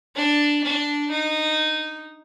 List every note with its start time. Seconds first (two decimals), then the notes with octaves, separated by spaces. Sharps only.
0.16 D4
0.64 D4
1.11 D#4